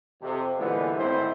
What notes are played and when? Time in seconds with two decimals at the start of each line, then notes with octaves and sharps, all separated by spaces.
0.22 F2 C3
0.59 A#2 D3 E3 G3 G#3 B3
0.98 G#1 A2 C4 E4 C5